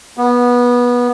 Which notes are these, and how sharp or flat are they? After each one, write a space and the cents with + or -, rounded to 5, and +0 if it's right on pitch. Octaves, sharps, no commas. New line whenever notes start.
B3 -20